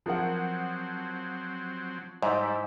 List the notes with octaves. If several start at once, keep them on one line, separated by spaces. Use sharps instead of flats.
F3 F#3 C4 A#4 F#5
G#2 G3 E4 C5 D#5